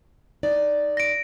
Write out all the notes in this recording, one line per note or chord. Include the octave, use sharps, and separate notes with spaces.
D#4 D5
A#6 D7